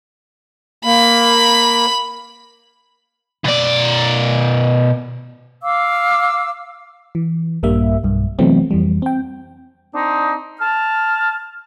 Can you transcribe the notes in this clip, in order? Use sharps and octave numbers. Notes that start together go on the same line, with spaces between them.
A#3 B5
B2 D5
F5 D6 E6
E3
A#1 G2 G3 A#3 E5
B1 G2
C3 E3 F#3 A3 B3 C4
F2 E3 G3
C4 G5
C4 D4 D#4
A5 F6